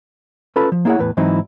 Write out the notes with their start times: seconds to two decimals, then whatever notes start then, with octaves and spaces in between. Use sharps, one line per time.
0.56 C#4 F4 A4 B4 B5
0.72 F3
0.85 A#3 B3 E4 G#4 C#5 F#5
0.99 E2 A2 B4
1.17 G#2 E3 F#3 C4 D#4 E4